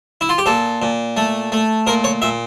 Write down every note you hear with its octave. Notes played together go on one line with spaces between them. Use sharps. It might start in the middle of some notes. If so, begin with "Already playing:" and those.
E4
F4
G4
A#2 A4
A#2
A3
A3
A#2 A#4
C#5
A#2 E5